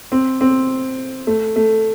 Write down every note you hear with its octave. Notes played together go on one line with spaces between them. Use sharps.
C4
C4
A3
A3